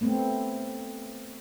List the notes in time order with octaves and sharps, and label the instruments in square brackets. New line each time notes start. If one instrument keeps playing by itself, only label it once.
[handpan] A3 B3 C4